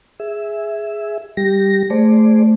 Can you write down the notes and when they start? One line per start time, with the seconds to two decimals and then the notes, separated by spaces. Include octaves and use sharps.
0.20 G#4 E5
1.37 G3 G4 A#6
1.90 A3 G#4 C5 D5